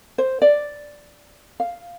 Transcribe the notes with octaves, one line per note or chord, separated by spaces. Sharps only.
C5
D5
F5